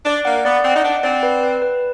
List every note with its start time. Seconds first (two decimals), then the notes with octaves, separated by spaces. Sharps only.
0.06 D4 D5
0.25 A#3 F#5
0.45 B3 D5
0.65 C4 F#5
0.76 D#4
0.84 D4 F#5
1.04 C4 D5
1.23 B4
1.43 B4
1.62 B4